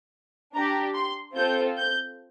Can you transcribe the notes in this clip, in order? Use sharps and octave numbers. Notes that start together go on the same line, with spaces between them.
D4 G4 A#5
C6
C4 F4 A4 G6
G6